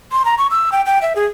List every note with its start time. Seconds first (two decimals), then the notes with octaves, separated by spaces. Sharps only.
0.12 C6
0.25 A#5
0.38 C#6
0.51 E6
0.72 G5
0.86 G5
1.02 E5
1.16 G#4